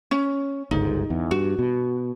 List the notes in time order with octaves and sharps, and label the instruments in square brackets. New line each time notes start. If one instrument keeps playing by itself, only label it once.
[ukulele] C#4
[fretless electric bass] G1 C#2 G#2 [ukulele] D#4
[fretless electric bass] E2
[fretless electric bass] G2 [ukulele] F#4
[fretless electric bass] B2